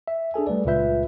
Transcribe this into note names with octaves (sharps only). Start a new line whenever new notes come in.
E5
D4 G#4 A4 G#5
G3 A3 B4 D5
C#2 A#2 F4 B4 E5 G6